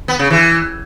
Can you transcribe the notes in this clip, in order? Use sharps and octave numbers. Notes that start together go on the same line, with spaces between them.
B3
C#3
E3